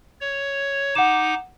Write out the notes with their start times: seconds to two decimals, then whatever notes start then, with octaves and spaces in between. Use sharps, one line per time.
0.21 C#5
0.95 D#4 F#5 D6 E7